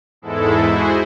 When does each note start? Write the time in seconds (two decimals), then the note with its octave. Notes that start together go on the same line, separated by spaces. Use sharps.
0.22 E2 G#2 G#3 E4 A4
0.66 E4 F#4 G#4 C5